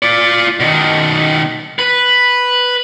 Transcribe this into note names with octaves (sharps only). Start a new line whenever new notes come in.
F4 D5
B2 D#3
B4